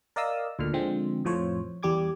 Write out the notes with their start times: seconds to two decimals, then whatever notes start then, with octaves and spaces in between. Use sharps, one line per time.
0.16 A#4 D5 D#5 F5 D#6 E6
0.59 D2 A#2 D3 F6
0.74 D3 F3 G#3 C4
1.25 F2 A2 F3 C5 C#5
1.83 E2 G3 G4 D6 G#6